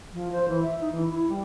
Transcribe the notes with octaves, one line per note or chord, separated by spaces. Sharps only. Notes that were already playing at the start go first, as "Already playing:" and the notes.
F3
C5
E3
E5
D#4
E3
E4
G3